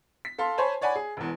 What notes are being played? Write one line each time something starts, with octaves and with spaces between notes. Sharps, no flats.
B6
A4 F5 C6
C5 C#5 G#5 A5 B5
C#5 D5 F#5 G#5 B5
G#4
E1 E2